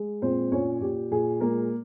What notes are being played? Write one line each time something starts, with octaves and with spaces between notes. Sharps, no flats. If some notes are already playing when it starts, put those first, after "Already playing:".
Already playing: G#3
A#2 C4 C5
A#2 C#4 C#5
A#2 G4
A#2 G#4
G#3 A#3 A#4